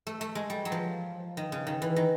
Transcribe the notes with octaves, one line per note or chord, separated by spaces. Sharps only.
A3
A3
G#3
G3
F#3
F3
D#3
C#3
D#3
E3
D#3